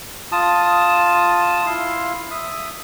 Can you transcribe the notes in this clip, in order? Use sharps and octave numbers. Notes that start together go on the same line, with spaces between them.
F4 A5 D#6
E4 F5 C6
E5 D#6